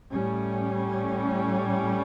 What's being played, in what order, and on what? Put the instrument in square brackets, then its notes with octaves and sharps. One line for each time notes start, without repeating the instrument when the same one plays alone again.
[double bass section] A2 G3 C#4